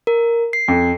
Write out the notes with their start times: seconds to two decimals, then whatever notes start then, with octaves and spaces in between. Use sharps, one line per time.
0.07 A#4
0.53 C7
0.68 F2